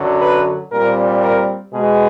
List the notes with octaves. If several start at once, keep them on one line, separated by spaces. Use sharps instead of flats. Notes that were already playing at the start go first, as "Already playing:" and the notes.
Already playing: F#2 D3 F#3
B4
A#2 G3 C4 A#4
A#4
B2 G#3 B3 G#4